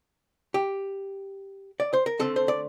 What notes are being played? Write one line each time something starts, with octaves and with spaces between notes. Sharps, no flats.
G4
D5
C5
A#4
D3 A3 C4 A4
C5
D5